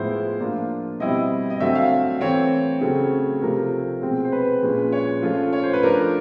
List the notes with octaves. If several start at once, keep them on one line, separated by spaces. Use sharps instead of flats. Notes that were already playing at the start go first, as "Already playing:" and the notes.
Already playing: A2 F3 G#3 B3 E4 C5
F3 A#3 D4 F4
B2 G3 C4 E4 D#5
D#5
D3 F#3 A3 C4 E5
F5
E3 A3 C4 C#5
C#3 F#3 A3 C4
C3 F3 A3 A#4
B2 G#3 C4
C5
B4
A#2 F3 G#3 C#4
C#5
F3 A3 C#4 F4
C#5
C5
B4
F3 A3 D4 A#4